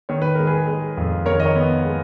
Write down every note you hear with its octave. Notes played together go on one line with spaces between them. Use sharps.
D#3 C#5
B4
G#3 A#4
G#4 B4
G#3
F2
D#3 A#4 C#5
D#5
A#4 C#5
B3
G#3